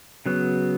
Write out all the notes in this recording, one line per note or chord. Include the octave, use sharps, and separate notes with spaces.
C#3 F#3 B3